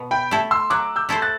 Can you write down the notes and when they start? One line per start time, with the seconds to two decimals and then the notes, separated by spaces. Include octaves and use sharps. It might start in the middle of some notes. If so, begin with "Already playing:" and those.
Already playing: B2
0.11 G5 B5
0.31 A3 E4 A4
0.51 C6 E6
0.70 F#3 D6 F#6
0.96 E6 G6
1.09 A3 E4 A4 C5
1.22 F#6 A6